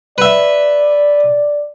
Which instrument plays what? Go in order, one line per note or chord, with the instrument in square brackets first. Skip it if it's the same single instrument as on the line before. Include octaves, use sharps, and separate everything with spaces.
[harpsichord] B4 E5 [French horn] D5